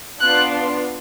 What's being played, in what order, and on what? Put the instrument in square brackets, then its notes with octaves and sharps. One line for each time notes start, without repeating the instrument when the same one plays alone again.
[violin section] B3 D4 F4 F#6